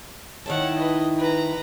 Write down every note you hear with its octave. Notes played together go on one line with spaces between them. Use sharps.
D#3 E4 C#5 F#5 A5
B4 D#5
B4 A#5